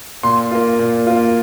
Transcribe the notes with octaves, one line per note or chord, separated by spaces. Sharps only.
A#2 C6
A#3 F4
A#2
A#3 F4